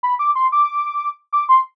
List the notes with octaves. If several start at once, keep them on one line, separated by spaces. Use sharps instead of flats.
B5
D6
C6
D6
D6
C6